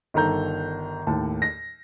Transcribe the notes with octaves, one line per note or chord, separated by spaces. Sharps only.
G1 D#3 A4 A#5 G6
D#2 A2 A5
A#6